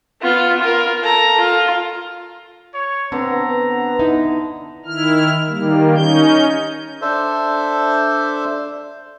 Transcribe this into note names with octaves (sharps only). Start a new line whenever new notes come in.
B3 F4
F4 A#4
A4 A#5
F4
C#5
D3 B3 C4 A#5
D#4 E4 B4
D#3 E4 F6
D#3 G3 A#3
C#4 D#4 G6
D4 A4 C5 E5